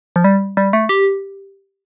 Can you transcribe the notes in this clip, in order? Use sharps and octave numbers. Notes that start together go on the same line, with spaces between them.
F3
G3
G3
A3
G4